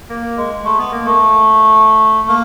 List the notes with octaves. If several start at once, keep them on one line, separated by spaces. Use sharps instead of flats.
A#3
G#3
A3
B3
A#3
A3
A#3